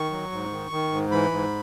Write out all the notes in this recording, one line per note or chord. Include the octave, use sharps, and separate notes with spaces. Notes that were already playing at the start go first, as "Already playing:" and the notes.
Already playing: D#3 C#6
F#3
G#2
D#3
D#3
G#2
E3 B5
G#2